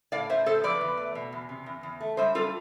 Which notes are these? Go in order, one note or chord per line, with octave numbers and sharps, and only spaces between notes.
A2 D5 F5
A2 C5 E5
A3 A4 C5
F3 B4 D5
E2
A3
B2
E2
C3
E2
E2
A3
G3 C5 E5
G3 F4 A4